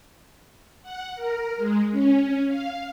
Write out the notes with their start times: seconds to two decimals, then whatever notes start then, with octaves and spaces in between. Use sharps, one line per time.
0.82 F#5
1.16 A#4
1.57 G#3
1.91 C#4
2.47 F5